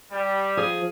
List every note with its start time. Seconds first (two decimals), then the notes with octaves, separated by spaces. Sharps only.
0.12 G3
0.57 F3 G#4